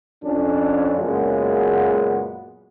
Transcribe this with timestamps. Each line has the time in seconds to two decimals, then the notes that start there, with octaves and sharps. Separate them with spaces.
0.24 F2 C#4 D4
0.98 F#2 A#2 C#3 G#3 B3